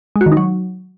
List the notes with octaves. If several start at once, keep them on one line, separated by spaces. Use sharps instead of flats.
G#3
F#4
D#3
D#4
F#3